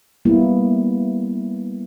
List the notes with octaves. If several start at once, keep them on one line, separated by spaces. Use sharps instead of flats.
G3 A#3 B3 E4